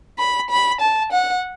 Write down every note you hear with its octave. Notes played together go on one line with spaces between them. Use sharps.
B5
B5
A5
F#5